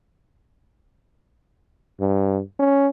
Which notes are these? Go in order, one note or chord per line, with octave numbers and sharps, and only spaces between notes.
G2
C#4